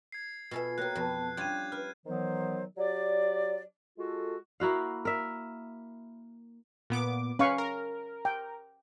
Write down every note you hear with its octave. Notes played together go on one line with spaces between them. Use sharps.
G#6 C7
B2 F4 A4 E5 G#5
A#3 F#4 A#4 C#5 G5 F#6
F2 B2 B3 B4 A5
G3 C#4 D4 F4 G6 G#6 D#7
B4 F6
D#3 E3 F#3 B3 C5
F#3 G4 D5
G#3 F4 F#4 A4
A#3 E4 F#4 F5
A#4 E5
A#2 B3 D6
C#4 B4 F5 C#6
A#4
G5